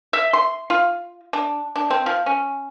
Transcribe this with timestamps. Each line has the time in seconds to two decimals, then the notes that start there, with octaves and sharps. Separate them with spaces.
0.13 E5
0.33 C6
0.70 F4
1.33 D4
1.76 D4
1.90 C4
2.06 F3
2.26 C#4